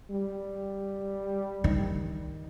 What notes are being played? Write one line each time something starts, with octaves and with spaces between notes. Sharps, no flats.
G3
D#3